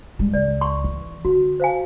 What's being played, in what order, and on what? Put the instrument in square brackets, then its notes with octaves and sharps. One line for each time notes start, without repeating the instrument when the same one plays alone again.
[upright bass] G3 G#3
[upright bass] C#2 [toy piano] D5
[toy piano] C6 C#6
[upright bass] E3
[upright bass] D3 [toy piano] F#4
[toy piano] C5 F5 G#5